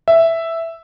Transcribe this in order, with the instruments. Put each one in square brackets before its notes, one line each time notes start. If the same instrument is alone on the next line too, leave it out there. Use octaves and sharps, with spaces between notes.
[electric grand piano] E5